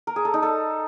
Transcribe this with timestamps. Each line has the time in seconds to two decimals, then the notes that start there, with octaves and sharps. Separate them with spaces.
0.07 A#4
0.16 G#4
0.25 A4
0.34 D#4
0.43 A4